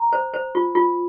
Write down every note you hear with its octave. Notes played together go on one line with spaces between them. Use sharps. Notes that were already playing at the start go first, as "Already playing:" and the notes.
Already playing: A#5
C5
C5
F4
F4